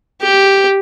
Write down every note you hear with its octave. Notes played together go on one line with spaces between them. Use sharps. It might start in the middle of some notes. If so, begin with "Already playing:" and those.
G4